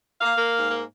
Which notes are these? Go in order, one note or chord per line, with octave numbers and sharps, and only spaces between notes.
A#3 F5
A#3
G#2
A#3